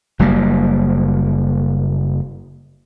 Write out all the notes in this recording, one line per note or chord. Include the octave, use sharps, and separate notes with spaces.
F#1 F#3 G3 A#3